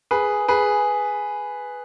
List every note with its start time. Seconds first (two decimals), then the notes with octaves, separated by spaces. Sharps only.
0.11 G#4 B4
0.48 G#4 B4